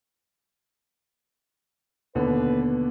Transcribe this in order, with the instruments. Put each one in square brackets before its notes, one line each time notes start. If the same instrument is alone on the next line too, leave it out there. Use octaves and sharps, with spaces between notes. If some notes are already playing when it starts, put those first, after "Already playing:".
[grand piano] D#2 B2 D3 [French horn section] B4